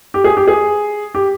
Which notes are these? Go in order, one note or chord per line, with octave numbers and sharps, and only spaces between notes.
G4
G#4
G4
G#4
G4